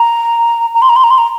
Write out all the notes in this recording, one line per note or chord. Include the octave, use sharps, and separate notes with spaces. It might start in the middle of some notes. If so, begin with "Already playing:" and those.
Already playing: A#5
A#5
C6
A#5
C6
A#5
C6
A#5